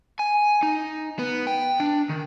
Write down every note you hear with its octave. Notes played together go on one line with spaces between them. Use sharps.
G#5
D#4
B3
G5
D4
D#3